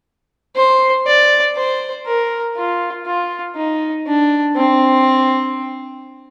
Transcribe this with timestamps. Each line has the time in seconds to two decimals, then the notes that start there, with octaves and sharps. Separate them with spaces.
0.56 C5
1.07 D5
1.56 C5
2.06 A#4
2.57 F4
3.06 F4
3.56 D#4
4.07 D4
4.57 C4